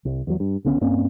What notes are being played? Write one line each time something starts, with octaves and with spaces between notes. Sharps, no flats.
C2
E2 F#3
G2
C#2 D3 B3 C#4
G2 A#3 C4 C#4